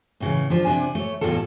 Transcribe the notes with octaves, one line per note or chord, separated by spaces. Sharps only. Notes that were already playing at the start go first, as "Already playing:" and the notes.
A2 C#3 E3
F3 D4
C3 D4 G#5
A3 C#5
E2 A2 G3 F4 A4